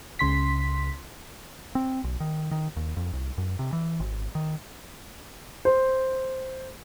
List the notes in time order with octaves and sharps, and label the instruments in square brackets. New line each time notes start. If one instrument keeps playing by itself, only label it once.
[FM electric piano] C#2 C#3 C6 B6
[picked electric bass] C4
B1
D#3
D#3
D#2
F2
C2
F#2
C3
E3
G#1
D#3
[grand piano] C5